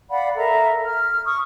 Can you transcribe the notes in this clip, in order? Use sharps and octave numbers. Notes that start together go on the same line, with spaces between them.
D5 F5 F#5 B5
A4 A#4 E5 A#5
F6
C#6 D#6